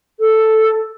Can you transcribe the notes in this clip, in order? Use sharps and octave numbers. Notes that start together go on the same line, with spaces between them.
A4